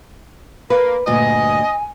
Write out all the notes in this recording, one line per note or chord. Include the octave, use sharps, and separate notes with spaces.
A#3 B4
D2 G2 A#2 D#5 G#5